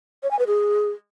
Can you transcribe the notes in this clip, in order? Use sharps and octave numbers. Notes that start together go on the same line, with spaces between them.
C#5
G#5
B4
G#4